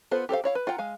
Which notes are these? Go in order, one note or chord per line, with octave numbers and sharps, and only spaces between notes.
B3 F4 A4 C5 F#5
G4 A4 C5 F5
E4 C#5 F5
B4
F4 F#5 G5 A#5
G#3 F5 G#5